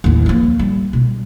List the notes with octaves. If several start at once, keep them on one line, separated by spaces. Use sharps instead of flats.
A1 D#2
F3 A#3
G3
B2